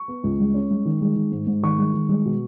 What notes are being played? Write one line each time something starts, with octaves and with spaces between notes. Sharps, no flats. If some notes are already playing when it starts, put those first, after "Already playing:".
Already playing: C#6
B3
C#2
G#3
C#4
G#3
D#3
G#3
D#3
G#2
G#2
D#3 C#6
G#3
D#3
G#3
B2